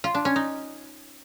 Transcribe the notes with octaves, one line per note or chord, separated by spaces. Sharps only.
F4
D4
C#4
D#4